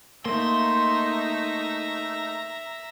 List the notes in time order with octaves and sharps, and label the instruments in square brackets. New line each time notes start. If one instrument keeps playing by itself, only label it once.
[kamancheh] A3 D#4 [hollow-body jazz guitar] A#3 [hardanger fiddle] E5 A#5 [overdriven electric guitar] C6